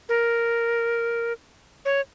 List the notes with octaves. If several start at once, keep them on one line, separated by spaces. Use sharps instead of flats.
A#4
C#5